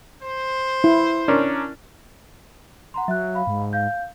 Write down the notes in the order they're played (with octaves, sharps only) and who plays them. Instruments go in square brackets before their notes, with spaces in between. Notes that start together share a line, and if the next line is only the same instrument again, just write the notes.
[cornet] C5
[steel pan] E4
[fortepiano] C#4 D4 A#4
[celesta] F#5 A#5 C6
[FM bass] F#3 [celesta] E5 F#6
[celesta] F5 B5
[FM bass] G#2
[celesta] F5 G6